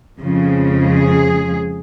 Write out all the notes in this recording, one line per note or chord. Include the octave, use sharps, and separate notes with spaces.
F2 C#3 F3 G#3
G#4